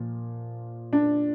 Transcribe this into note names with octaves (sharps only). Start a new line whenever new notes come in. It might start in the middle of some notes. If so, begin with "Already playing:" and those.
Already playing: A#2 F3
D4